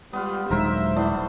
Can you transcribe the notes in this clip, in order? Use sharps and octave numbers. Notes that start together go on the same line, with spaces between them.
G3 G#3 B3 F4
D#1 F#3 G#3 D4 D#4 A#4 C5 E5
G3 A3 B3 E4 C5 D5